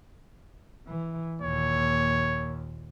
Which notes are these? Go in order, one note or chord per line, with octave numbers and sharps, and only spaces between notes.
E3
D#2 A#2 C#5